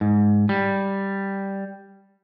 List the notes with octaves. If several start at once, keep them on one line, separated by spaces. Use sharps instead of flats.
G#2
G3